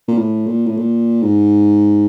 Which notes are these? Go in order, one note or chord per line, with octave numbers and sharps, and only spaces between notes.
A#2
A2
A#2
A2
A#2
G#2